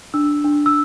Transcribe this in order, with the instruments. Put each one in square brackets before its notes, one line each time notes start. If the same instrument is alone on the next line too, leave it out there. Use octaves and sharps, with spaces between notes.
[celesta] D4 E6
D4
E6